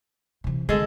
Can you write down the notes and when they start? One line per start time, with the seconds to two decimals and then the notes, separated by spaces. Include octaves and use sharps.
0.44 C3 E3
0.69 F2 D3 G#3 A4